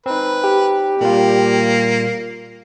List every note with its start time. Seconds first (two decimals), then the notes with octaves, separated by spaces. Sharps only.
0.06 C4 D#4 B4
0.44 G4
1.01 A#2 G3 A#3 F4